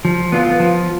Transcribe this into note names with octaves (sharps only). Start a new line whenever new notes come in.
F3
B3 F4
F3